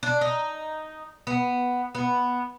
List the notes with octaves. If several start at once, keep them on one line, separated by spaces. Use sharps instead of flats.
D4
D#4
B3
B3